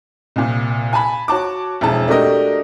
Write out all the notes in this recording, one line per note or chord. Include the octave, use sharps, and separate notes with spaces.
C2 A#2
G#5 A5 B5
F#4 C#5 A5 D6
E1 F2 E4 A5
A3 D4 F#4 G4 A#4 D#5